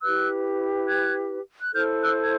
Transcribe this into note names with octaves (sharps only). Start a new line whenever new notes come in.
E4 G4 B4 E6 F#6
F#6 G#6
F#6
E4 A4 C5 F6 G6
E6 F#6
G#6